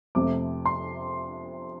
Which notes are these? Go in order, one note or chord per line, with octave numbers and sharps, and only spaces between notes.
F2 C3 F3 A3 D6
C6